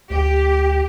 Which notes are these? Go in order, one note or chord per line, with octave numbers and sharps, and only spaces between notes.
D2 G4